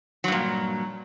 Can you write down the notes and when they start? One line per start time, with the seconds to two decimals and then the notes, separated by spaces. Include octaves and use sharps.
0.24 F#3
0.28 G2
0.32 A#2